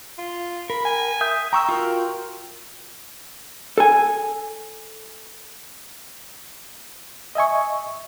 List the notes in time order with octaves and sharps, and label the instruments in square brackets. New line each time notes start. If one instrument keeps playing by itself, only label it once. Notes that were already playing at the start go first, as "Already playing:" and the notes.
[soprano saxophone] F4
[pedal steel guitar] A#4 [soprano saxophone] B5
[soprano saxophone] G#5
[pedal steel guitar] E5 D#6 G6
[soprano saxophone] G5 [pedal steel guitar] A#5 C#6 E6
[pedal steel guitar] F4 F#4 A#4
[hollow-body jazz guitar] A4 G#5
[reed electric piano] D#5 E5 G#5 C#6